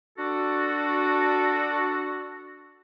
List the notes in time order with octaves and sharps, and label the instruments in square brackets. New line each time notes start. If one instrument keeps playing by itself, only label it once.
[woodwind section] D4 F#4 A4